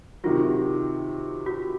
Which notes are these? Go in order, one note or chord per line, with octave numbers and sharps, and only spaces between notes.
C3 D#3 F#3 F4
F#4